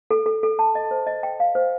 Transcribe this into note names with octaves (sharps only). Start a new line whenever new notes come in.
A4
A4
A4
A5
D#5
C5
D#5
G5
F5
C5